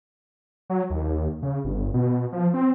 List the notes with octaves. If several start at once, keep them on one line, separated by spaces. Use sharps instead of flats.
F#3
D#2
C#3
G1
B2
F3
C4